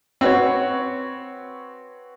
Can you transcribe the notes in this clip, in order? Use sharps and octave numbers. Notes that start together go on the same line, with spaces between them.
C4 F#4 B4 C#5